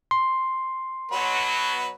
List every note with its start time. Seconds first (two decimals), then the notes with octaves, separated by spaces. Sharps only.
0.11 C6
1.12 B2 F#3 B4